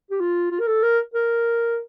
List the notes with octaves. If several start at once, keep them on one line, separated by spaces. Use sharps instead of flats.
G4
F4
F4
A#4
A4
A#4
A#4